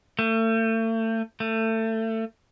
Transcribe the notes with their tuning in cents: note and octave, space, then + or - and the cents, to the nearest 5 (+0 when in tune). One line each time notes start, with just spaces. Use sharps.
A3 +35
A3 +25